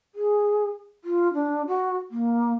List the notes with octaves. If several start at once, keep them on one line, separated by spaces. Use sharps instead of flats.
G#4
F4
D4
F#4
A#3